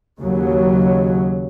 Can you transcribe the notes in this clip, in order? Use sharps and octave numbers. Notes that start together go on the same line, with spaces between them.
D#2 C#3 F#3